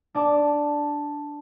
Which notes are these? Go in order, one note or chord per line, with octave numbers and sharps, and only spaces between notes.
D4 D5 A5 D6